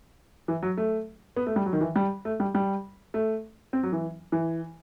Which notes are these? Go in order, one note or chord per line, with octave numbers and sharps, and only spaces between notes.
E3
F#3
A3
B3
A3
G3
F#3
D#3
E3
G3
A3
G3
G3
A3
C4
F#3
E3
E3